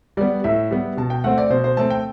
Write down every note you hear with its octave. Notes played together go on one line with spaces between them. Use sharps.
G3 B3 D5
A2 E5
G3 B3
B2 A5
G5
A3 C4 F#5
D5
B2 C5
C5
A3 C4 A5
G5